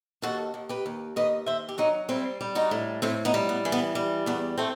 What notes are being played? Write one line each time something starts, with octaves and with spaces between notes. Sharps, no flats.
D#2 F#4 A4
D#2
G4 B4
D#2
D#2 B4 D#5
D#2 C5 E5
G4
F#3 D#4 F#4
G3 C4 E4
G3
D#4 F#4
A2
A2 C4 E4
B3 D#4
G3
B3
E3
B3
G3
E2 B3
A3 C4